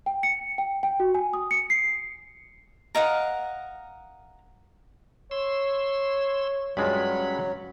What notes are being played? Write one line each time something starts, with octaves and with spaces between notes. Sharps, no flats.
G5
C#7
G5
G5
F#4
G#5
D#6
C#7
C7
A#4 D#5 F5 F#5
C#5 C6 E6
G2 F#3 G#3 C#4 F4 B5